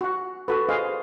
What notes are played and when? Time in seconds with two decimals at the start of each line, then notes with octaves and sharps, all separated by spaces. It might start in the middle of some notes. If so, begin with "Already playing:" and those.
0.01 F#4 F#5
0.48 F#4 A4 B4
0.69 G#4 C5 D#5 F5